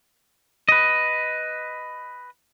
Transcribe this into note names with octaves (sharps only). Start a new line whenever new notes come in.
B4 D#5